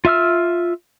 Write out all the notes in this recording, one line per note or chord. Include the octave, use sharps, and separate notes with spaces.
F4 E5 E6 F6